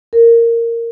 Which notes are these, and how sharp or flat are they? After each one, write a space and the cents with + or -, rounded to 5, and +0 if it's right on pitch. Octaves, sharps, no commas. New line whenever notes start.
A#4 -10